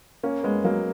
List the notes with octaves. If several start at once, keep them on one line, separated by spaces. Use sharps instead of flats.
A#3 C#4
G#3 B3
F#3 A#3